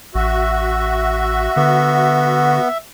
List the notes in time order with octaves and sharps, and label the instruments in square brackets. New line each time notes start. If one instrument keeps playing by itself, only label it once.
[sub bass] A1 [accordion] F#4 [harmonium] E5
[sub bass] D3 [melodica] B3